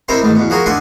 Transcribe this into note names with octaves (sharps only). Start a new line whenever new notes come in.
C4 D#4 E4 G4 A#4 C5
A1 G#2 D#3
E2 B2
F3 F#4 G#4 A#4
D#2 D4 D#5 F#5 G#5 C6